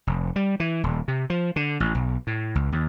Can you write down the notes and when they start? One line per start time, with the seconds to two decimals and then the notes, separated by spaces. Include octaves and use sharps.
0.07 F1
0.36 G3
0.60 E3
0.83 D#1
1.08 C3
1.30 F3
1.56 D3
1.80 A1
1.95 B1
2.27 A2
2.55 C#2
2.72 D#2